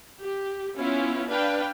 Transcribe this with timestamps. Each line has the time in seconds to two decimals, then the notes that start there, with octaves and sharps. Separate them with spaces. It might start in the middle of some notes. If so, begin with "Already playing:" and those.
0.21 G4
0.77 B3 C#4 E4 F4
1.29 D4 B4 F5 G5